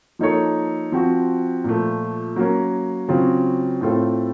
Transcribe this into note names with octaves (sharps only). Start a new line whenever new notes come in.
F3 A#3 D#4 A4 C#5
F3 C4 F#4
A#2 F3 A3
F#3 A#3 C#4
C#3 F#3 C4 F4
A2 A3 C4 F4 A4